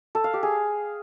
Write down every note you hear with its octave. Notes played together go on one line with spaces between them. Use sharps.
A4
F5
G4
G#4